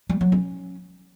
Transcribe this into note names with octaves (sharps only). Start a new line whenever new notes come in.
G3
F#3
C#4